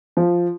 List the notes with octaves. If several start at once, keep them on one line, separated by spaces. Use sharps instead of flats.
F3